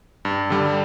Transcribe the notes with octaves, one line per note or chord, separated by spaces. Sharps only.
G2
D3 G3